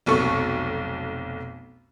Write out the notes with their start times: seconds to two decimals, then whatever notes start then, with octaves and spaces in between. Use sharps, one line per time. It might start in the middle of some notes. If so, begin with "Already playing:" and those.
0.06 F1 B1 A4 C#6